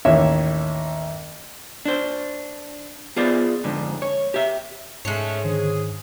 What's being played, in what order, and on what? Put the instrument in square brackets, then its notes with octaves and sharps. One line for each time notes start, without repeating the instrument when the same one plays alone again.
[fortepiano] A1 D#2 C#5 E5
[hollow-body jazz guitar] D4 C5
B3 F4 G#4 C5 D5
F2 G#2 D3
C#5
G4 E5
[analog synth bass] G#2 [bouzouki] G#3 C#5 [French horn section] A3 C#4
[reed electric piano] D3 D#3 C5 [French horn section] G#4